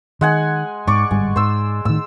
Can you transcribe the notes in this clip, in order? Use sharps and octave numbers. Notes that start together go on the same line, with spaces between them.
D#3 G#3 F#5 G#5
G#2 D5 C#6 D6
G1 G#2 G3 G#5
G#2 C5 E6
A2 D#3 E6